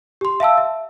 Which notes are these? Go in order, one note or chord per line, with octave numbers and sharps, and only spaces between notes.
G4 C6
E5 F5 A5 E6
E5